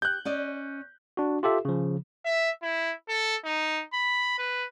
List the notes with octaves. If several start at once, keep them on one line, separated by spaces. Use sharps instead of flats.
G4 F#6 G6
C#4 D5 D#5
D4 F#4
F4 G4 A4 E5
C#3 F3
E5
E4
A4
D#4
B5
B4